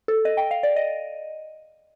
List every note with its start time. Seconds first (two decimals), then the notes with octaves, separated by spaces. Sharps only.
0.08 A4
0.25 D#5
0.37 G5
0.51 F5
0.63 D5
0.76 D#5